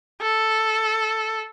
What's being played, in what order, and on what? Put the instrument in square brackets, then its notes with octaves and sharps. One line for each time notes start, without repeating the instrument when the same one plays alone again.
[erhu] A4